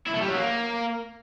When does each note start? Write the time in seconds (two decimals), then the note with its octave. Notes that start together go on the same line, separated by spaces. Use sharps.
0.07 E4
0.14 A3
0.21 G3
0.28 F#3
0.36 A#3